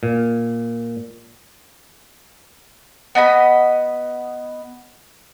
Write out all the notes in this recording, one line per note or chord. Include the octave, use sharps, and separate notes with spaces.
A#2
B3 D#5 A5 B5